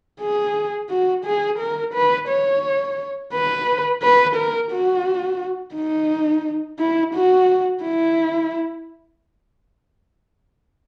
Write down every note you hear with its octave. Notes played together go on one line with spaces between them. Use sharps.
G#4
F#4
G#4
A#4
B4
C#5
B4
B4
A#4
F#4
D#4
E4
F#4
E4